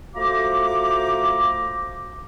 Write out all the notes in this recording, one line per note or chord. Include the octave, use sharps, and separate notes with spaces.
A3 F4 F#4 C5 A#5 D6